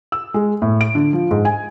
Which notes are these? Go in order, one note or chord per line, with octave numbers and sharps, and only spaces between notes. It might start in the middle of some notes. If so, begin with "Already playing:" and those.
E6
G#3
A2
D7
D3
F3
G#2
G#5